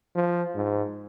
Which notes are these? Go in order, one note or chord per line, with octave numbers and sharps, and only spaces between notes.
F3
G#2